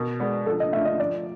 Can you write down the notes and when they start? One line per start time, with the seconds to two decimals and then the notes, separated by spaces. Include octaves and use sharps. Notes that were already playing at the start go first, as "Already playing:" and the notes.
Already playing: B2 A#4
0.20 G#3 B3 D4
0.46 F3 A4
0.60 D#5
0.72 A3 D4 F4 E5
0.85 D#5
1.00 F3 D5